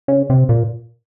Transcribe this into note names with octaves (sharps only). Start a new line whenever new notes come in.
C#3
C3
A#2